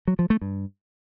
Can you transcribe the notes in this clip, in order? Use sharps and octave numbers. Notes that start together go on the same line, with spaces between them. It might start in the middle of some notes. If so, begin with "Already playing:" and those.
F#3
F3
A3
G2